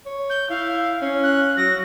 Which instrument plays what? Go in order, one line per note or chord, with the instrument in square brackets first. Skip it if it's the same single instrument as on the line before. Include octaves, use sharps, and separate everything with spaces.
[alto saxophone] C#5
[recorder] G6
[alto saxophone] E4 [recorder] F5
[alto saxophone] C#4
[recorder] F#6
[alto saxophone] F#3 [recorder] A#6